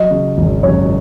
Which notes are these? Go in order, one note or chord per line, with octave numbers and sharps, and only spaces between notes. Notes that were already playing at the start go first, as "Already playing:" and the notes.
Already playing: F#3 D#5
C#3
G#1
F#2 C#5